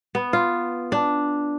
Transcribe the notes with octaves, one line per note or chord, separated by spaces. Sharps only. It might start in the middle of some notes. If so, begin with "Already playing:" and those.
B3
F4
D4